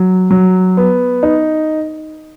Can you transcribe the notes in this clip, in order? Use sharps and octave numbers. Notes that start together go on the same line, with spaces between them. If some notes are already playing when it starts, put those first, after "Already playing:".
Already playing: F#3
F#3
B3
D#4